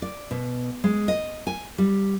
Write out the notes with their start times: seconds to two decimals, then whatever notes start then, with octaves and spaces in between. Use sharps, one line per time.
0.02 D5
0.31 B2
0.84 G#3
1.08 D#5
1.47 G#5
1.78 G3